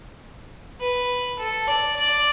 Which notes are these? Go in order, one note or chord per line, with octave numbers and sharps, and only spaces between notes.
B4
A4
D5
D5